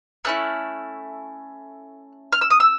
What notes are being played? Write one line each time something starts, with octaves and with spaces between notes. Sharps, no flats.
A3 C#4 E4 F#6
F6
E6
D#6
E6